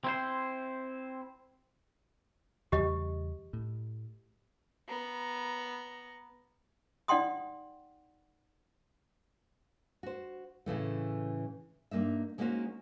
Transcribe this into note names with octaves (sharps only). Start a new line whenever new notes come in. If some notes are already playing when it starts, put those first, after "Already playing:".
C4 E4 C5
E2 C#3 G3 G4 D#5
A2
B3 A#5
D#4 D5 F#5 G5 C6 D#6
F#4 C5
A2 C#3 E3 A3
G2 A#3 D#4 E5
G#3 A#3 C#4 D#4 F#4 C5